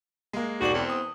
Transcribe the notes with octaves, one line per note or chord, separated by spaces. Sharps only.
G#3 A#3
E1 G#2 F#4 D5 F#7
E2 C4
D#6